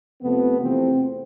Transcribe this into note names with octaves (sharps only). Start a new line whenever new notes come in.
F2 C3 F3 A3 B3
E2 C3 F3 A3 C4